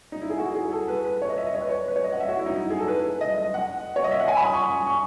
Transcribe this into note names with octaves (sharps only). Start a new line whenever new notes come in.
D#4
E4
G#4
F#4
G#4
A4
B4
B4
C#5
D#5
E5
D#5
C#5
B4
C#5
B4
C#5
D#5
F#5
E5
F#4
E4
D#4
E4
G#4
A4
B4
D#5
D#5
F#5
C#5
D#5
E5
F#5
G#5
B5
D#6
C#6
C#6